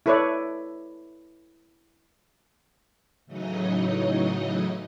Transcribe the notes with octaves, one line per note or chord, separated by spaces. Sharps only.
E4 A4 B4 C#5 D5
A2 C#3 E3 F#3 D#4 D#5